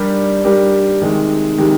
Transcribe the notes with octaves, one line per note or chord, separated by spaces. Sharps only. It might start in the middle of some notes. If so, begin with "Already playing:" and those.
Already playing: G3 D4 G4 A#4
G3 D4 G4 A#4
C3 D#3 G#3
C3 D#3 G#3